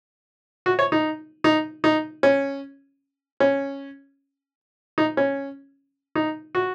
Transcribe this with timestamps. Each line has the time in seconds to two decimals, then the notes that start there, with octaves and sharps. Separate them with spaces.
0.66 F#4
0.79 C#5
0.92 D#4
1.44 D#4
1.84 D#4
2.23 C#4
3.40 C#4
4.98 D#4
5.17 C#4
6.15 D#4
6.55 F#4